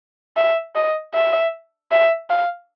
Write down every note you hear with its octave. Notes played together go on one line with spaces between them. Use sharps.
E5
D#5
E5
E5
F5